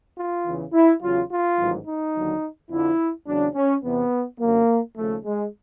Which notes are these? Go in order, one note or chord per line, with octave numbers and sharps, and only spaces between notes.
F4
E2 C#3 E3
E4
E2 C#3 F#3 F4
F4
A1 G#2 D#3 F#3
D#4
D#2 D3 F#3
F2 D3 F3 E4
E2 C#3 F#3 D4
C#4
E2 C3 E3 B3
F#2 D3 F#3 A#3
D#2 C#3 F3 A3
G#3